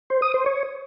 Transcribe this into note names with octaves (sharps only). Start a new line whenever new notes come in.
C5
D#6
C5
C#5